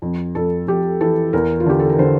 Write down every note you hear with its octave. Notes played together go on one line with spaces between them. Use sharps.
F2
F2 A4
F2 G4
E3 A4
E2 A#4
F4
D3 G4
A4
A#4
D3 C5